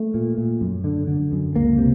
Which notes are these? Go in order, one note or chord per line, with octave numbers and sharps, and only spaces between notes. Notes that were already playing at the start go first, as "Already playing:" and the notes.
Already playing: A3
A#2
A#2
F#2
D3
D3
F#2
C#2 A#3
C3